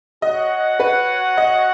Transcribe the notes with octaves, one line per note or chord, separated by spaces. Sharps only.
F#4 C#5 D#5 F#5
B4
D#5